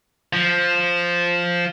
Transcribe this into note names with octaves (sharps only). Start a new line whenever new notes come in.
F3